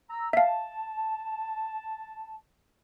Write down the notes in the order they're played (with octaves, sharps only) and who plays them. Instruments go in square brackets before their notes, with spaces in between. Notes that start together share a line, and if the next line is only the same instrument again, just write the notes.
[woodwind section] A#5 E6
[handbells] E5 F5 [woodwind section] A5